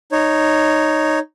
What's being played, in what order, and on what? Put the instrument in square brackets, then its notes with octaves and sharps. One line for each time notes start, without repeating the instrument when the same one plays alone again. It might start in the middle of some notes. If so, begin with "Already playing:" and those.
[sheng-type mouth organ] D#4 C#5